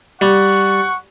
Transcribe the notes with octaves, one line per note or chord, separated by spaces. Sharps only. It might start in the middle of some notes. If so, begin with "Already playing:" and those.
G3 F#5 C#6